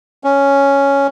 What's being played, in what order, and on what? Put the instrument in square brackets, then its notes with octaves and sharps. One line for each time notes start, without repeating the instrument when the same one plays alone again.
[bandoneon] C#4